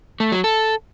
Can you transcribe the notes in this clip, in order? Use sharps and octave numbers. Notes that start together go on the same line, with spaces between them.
A3
F#3
A4